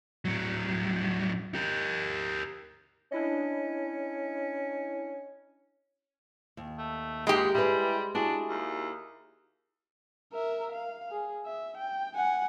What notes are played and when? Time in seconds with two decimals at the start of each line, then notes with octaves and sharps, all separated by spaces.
0.25 A2 F#3
1.54 G4 A#4
3.12 C#4 D4 E4 D#5
6.57 D#2
6.78 A3
7.27 A#2 G#3 G4
7.54 G3 E4 G#4 B4
8.15 D4 E4 F#4 G#4
8.49 D#2
10.33 A#4 E5
10.72 F5
11.11 G#4
11.45 E5
11.77 G5
12.16 F#5 G#5